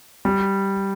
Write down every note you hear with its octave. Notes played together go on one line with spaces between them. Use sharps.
G3